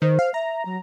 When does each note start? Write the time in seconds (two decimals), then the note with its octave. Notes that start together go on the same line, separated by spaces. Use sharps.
0.02 D#3 C5
0.19 F5
0.34 E5 A#5
0.65 F#3